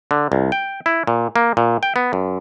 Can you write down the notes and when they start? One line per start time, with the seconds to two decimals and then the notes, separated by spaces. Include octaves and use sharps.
0.11 D3
0.32 C2
0.52 G5
0.86 E4
1.07 A#2
1.36 A#3
1.57 A#2
1.83 G5
1.96 B3
2.13 F#2